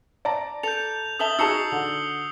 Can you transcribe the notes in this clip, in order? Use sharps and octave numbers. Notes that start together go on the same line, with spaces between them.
D5 A5 A#5
A4 G6 F7
A4 E5 A5 D#6 F#7 G7
D#4 F#4 G#4 A5 E6 C7 C#7
D3